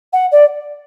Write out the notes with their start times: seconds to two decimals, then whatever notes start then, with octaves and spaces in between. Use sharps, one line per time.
0.13 F#5
0.31 D5